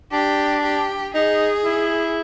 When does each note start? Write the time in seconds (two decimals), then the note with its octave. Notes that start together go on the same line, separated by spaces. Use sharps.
0.12 D4 G4
0.63 G4
1.15 D#4 G#4
1.64 E4